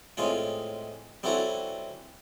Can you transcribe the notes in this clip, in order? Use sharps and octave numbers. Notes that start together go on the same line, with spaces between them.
A2 G#3 C4 C#4 F4
G3 C4 C#4 E4 F#4 A4